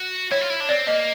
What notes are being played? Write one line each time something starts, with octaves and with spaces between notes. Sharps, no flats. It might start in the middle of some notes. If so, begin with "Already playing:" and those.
Already playing: F#4
E4 C#5
F4
E4
D4
C4 D5
A#3 D#5